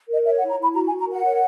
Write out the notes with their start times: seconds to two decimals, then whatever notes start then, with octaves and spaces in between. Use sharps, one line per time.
0.09 A#4 D#5
0.25 C#5 E5
0.38 F#5
0.42 E4
0.50 A#5
0.58 E4 B5
0.74 F#4 A#5
0.87 G#5
0.91 F#4
0.99 A#5
1.07 A#4
1.12 F#5
1.24 C#5